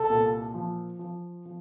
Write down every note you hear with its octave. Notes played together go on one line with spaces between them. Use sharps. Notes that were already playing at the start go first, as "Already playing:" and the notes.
Already playing: C2 A4
A#2
F3
F3
F3